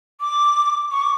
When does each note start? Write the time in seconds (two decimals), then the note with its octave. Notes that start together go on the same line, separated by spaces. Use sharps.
0.21 D6
0.91 C#6
1.02 D6